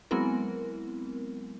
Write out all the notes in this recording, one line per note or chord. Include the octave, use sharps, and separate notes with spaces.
F#3 G#3 B3 C4 E4 A#4